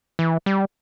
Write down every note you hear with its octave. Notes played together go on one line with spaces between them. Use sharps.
E3
G3